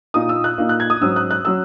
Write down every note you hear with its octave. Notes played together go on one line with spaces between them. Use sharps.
A#2 A#3 D#4 D#6
E6
F#6
A#2 A#3 D#4
F#6
G#6
D#6
G#2 F#3 C#4 E6
F#6
F#6
F#3 C#4 E6